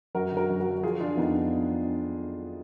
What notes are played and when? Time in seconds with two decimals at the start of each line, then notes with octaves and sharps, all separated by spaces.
0.15 F#2 F#4 A#4
0.32 D3
0.37 F#4 A#4
0.49 F#2
0.60 F#4 A#4
0.66 F#3
0.83 F3 F4 G#4
1.00 F3 D4 F4
1.17 F2 B3 D#4